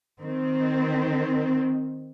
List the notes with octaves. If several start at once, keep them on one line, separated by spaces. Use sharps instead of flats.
D#3 C4